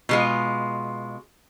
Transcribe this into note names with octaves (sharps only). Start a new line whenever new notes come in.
B2 G#3 F4